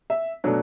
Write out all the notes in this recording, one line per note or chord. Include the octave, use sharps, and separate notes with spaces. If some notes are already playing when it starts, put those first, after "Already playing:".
E5
B2 F#3 A3 D4